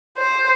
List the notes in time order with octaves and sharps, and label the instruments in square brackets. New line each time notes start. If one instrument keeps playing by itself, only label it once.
[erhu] C5